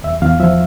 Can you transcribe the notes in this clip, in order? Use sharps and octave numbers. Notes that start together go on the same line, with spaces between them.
E2 E5
E2 F5
F3 E5